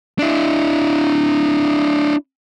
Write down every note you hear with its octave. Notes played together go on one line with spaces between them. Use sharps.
D4 E4